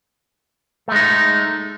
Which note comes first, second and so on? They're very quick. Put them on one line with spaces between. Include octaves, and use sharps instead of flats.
A3 G#3 D#4